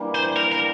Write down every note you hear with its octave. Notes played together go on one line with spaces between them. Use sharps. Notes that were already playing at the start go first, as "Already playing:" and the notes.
Already playing: E3 G3 A#3 D4
C5
A#4
A#4